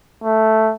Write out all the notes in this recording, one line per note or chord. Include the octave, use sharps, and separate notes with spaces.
A3